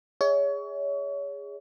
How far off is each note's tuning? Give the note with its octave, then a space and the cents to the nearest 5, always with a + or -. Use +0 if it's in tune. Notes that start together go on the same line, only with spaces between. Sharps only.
G#4 -15 C#5 +30 E5 -45